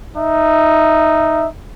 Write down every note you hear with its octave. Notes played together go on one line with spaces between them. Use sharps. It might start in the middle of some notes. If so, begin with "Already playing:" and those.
D#4 E5